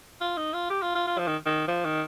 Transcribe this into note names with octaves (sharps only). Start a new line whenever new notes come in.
F4
D#4
F4
G4
F4
F4
F4
F3
D#3
D#3
F3
D#3